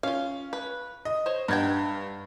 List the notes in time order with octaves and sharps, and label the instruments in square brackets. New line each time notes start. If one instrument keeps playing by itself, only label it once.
[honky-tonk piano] C#4 [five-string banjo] F4 F5
[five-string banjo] B4
[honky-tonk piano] D#5
[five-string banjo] C5 C#5
[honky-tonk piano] G2 G#6 [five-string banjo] D#4 F#5 G5